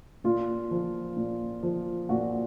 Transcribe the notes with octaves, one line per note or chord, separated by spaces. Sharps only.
A#2 F4
F3
A#2
F3
A#2 F#4